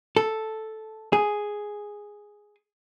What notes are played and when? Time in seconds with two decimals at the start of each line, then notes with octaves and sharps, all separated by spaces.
0.17 A4
1.13 G#4